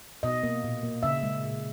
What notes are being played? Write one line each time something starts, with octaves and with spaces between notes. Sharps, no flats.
B2 D#5
A#3
A#2
A#3
C#3 E5
G#3
A#2